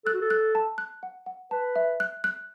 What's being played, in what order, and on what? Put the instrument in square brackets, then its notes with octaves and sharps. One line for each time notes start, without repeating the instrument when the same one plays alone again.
[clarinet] A4 [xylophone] F#6
[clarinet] F#4
A4
[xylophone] F#6
A5
F#6
F#5
F#5
[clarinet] B4 [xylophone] A5
[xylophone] E5
F#6
F#6